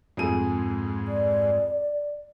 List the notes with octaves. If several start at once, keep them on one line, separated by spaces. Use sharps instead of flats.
F2 G#2 G#4 D#7
D5